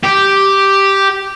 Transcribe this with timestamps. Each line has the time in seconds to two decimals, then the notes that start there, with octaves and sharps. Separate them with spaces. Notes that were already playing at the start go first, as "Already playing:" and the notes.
0.03 G4